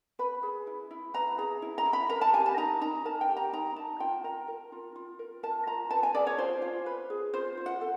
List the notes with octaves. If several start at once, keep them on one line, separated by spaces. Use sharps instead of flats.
B4 B5
G#4
E4
E4
B4 A#5
G#4 A#5
E4
A#5
E4
B5
A#4 A#5
A5
G4 G#5
A5
D#4 A#5
D#4 A#5
A#4 A5
G5
G4
A#5
D#4 A#5
D#4 A5
F4 G5
A#4 A#5
A#4
F4
F4
A#4
A#4 A5
F4 A#5
B4 A5
G#5
G#4 D5
C#5
F4 C5
F4
B4
G#4
F4 C5
F4
F#5
A4